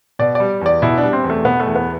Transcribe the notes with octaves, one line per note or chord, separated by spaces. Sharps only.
B2 D5
G3 D5
E2 D5
B2 E4
D4
G3
C4
E2
A3
B2 B3
A3
E2
B3